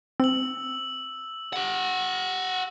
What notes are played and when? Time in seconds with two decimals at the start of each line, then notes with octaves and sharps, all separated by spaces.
0.20 C4 E6 F#7
1.53 G4 F#5